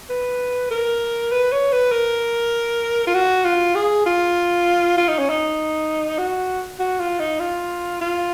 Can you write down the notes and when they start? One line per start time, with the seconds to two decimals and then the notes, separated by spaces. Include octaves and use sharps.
0.10 B4
0.71 A#4
1.32 B4
1.52 C#5
1.73 B4
1.92 A#4
3.07 F4
3.14 F#4
3.45 F4
3.75 G#4
4.06 F4
4.97 F4
5.08 D#4
5.19 C#4
5.30 D#4
6.19 F#4
6.80 F#4
7.00 F4
7.20 D#4
7.40 F4
8.01 F4